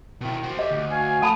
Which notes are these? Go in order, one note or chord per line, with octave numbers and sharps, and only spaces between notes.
B2 D#3 E4
F#4 C5
G4 C#5 D#5 E5
D2
F#4 F5 G#5
A3 F#5 A5 B5 D#6